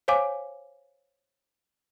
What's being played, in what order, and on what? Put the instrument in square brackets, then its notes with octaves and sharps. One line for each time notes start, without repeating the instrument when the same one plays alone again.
[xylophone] C5 C#5 F5 G#5 D6